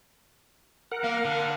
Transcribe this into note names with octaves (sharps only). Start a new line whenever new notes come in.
A#4 F#5
A#3 F5
D3